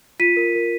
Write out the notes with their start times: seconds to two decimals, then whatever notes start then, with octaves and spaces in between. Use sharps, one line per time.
0.20 F4 B6 D#7
0.37 A#4
0.55 A#4